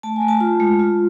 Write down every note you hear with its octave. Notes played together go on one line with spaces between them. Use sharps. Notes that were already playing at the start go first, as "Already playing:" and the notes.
A3 A5
G#5
A3
A5
F4
G#3
F4